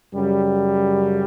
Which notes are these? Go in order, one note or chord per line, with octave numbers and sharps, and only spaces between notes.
F#2 C#3 G3